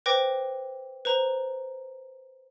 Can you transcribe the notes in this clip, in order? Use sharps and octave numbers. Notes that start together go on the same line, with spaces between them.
B4 C5 G5 D6 A#6
B4 C5 A#5